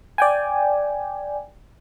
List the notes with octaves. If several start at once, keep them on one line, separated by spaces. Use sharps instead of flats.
D5 G5 G#5